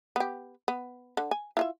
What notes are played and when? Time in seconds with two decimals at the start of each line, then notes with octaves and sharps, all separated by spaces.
0.16 B3 G4
0.68 B3
1.17 D3
1.31 G#5
1.57 E4 F4 E5